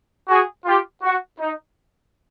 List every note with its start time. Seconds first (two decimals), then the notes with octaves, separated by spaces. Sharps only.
0.29 F#4 G#4
0.66 F4 G4
1.03 F#4
1.39 D#4